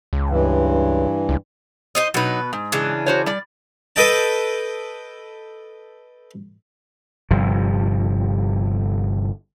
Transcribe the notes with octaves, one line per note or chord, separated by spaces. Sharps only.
C#2
G2 E3
C#2
D#4 C5 D#5
B2 F#3 D#4 B4
G#2
C#3 E3 D4
F#4 C5 C#5
G3 D5
A4 B4 D#5 G5 A5
G1 G2 C3 F3